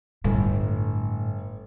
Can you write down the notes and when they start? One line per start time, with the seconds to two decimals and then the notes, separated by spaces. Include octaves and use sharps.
0.24 G1 A2